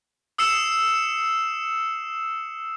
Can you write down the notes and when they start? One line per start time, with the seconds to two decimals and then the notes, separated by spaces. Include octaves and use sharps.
0.38 D#6 E6 C7 C#7 E7